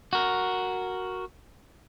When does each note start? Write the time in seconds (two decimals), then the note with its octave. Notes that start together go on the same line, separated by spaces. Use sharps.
0.13 F#4 A#4